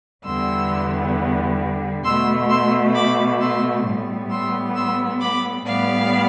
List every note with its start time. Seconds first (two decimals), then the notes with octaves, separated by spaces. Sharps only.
0.24 E2 D3 G3 B3 C6 E6
2.04 B2 A3 C6 E6
2.50 C6 E6
2.95 B5 D6
3.40 C6 E6
3.85 A2 G3 B3
4.30 C6 E6
4.76 C6 E6
5.21 B5 D6
5.66 A2 G3 B3 D5 F5